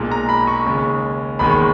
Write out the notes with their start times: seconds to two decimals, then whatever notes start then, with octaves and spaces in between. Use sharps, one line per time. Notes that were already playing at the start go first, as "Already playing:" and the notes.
Already playing: B1 A#2 G#3
0.12 A#5
0.29 B5
0.47 C#6
0.66 D#2 C#3 G#3
1.39 E1 D#2 D#3 G#3 B5
1.50 C#6